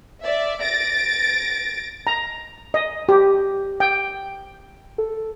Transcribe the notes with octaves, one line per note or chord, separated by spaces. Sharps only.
D5 E5
A6 A#6 D7
A#5
D#5
G4
G5
A4